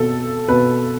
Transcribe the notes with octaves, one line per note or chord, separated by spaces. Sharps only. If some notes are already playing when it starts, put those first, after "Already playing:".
Already playing: B2 A4
B2 B4